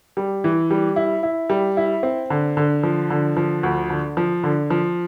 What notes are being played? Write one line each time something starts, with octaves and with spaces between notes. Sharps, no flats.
G3
E3
G3
E4
E4
G3
E4
C4
D3
D3
F3
D3
F3
D2
D3
F3
D3
F3